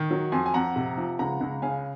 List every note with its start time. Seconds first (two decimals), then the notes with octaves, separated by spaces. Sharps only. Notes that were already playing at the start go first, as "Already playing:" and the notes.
Already playing: D#3
0.11 F#3
0.32 F2 G#5 C6
0.46 G#5
0.54 F2 F#5 A#5
0.76 C3
0.97 F3
1.19 C#2 F#5 A#5
1.41 C#2
1.62 C#3 F5 G#5